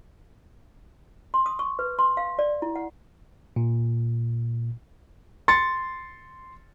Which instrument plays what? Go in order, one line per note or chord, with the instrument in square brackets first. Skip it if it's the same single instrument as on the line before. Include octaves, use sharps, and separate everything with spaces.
[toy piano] C6
D#6
C#6
B4
C6
F5
D5
E4
F#5
[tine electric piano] A#2
[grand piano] C6 A6 C#7